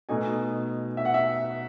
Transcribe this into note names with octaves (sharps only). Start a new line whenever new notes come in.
B2 A3 D#4 G#5
E5
F#5
E5